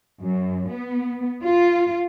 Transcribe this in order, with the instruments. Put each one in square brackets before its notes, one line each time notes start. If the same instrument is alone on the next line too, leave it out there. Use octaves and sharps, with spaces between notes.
[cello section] F#2
B3
F4